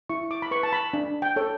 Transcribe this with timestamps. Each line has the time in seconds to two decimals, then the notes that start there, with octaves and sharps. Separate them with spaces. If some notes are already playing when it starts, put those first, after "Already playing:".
0.09 E4 C#6
0.31 D6
0.42 B5
0.51 B4 C#6
0.63 A5
0.73 B5
0.93 D4
1.22 G5
1.36 A4 C#5